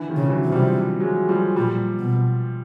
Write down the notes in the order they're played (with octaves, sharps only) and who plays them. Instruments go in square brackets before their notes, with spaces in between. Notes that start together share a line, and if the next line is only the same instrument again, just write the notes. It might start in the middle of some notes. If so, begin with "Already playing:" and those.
Already playing: [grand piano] D3 E3
D#3 F3
[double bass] C#3
[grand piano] E3 F#3
[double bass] C3
[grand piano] F3 G3
F#3 G#3
F3 G3
[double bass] A#2 [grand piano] F3 G3
[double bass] B2